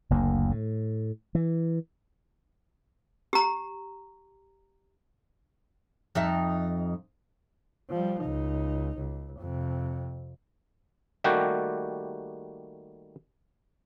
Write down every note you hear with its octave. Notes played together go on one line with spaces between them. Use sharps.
F#1 D2 A#3
A2
E3
G4 A#5
F2 D#4 E5
F3 G3
C#2 D#4
C#2
F2 C3
D#3 G3 A3 A#3 F#4 G4